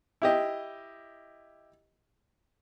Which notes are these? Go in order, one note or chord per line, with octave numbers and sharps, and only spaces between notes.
E4 G4 D#5